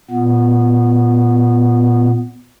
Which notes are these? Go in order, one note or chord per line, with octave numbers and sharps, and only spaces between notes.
A#2 B3